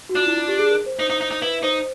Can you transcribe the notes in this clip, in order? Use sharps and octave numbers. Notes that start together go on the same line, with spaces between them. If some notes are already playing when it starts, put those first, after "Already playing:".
F#4
D4 F4
E4
F4
G4
G#4
A#4
C5
D#4 C5
D#4
D#4
D#4
E4 B4
D#4 C5